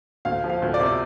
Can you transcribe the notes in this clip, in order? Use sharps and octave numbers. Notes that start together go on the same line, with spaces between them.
D2 F5
F3
F5
D2
D5
C3